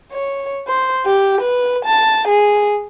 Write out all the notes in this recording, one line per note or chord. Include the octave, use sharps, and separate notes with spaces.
C#5
C5
G4
B4
A5
G#4